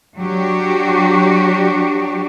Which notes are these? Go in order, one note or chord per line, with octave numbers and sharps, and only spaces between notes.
F#3 D4 F#4 G4